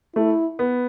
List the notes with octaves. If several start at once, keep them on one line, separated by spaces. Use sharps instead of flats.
A3 E4
B3